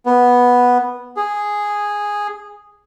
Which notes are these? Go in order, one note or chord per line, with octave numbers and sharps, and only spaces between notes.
B3
G#4